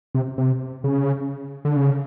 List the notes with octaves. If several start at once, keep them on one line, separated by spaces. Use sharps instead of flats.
C3
C3
C#3
D3
C#3